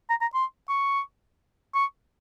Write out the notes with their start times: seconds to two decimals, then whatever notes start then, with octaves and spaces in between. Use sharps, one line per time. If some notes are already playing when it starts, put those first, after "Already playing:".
0.10 A#5
0.21 A#5
0.34 C6
0.69 C#6
1.74 C#6